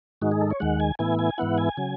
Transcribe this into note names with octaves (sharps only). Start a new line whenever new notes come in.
G#2 D#3 G#3 D#4 F#4
G#4
A4
C#5
D#2 D#3 G#3 F#5
G#5
A2 E3 B3 E4 G#5
G#5
G#2 E3 B3 E4 F#5
G#5
C#3 F#3